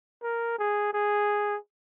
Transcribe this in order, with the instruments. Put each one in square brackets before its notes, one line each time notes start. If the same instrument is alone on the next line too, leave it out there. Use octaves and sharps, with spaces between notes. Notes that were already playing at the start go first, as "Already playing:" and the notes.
[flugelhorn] A#4
G#4
G#4